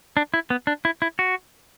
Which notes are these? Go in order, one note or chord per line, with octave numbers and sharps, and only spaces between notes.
D4
E4
B3
D4
E4
E4
F#4